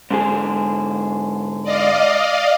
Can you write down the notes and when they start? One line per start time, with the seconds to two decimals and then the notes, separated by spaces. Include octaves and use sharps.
0.11 G#2 D3 G#4
1.63 D5 D#5 F5